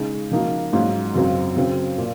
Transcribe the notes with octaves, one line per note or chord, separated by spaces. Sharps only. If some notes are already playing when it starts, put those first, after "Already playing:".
Already playing: C#3 G#3 D#4 G#4
C#3 F3 A#3 D#4 F#4
G#2 F#3 C#4 F4
F#2 C#3 F#3 C4 F4
C#3 F#3 C4
A#2